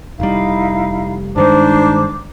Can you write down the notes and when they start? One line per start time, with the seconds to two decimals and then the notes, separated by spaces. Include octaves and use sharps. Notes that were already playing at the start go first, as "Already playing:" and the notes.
0.20 F1 G3 D#4 E4 F5
1.36 G2 D#3 G#3 D4 D#4 C5 D6